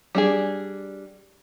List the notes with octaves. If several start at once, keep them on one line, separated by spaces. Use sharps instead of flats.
G3 D4 G#4